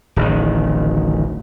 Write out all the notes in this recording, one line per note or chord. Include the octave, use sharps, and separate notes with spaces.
D1 A1 D#3